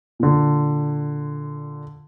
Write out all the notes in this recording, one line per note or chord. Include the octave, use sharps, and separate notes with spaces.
A#2 D3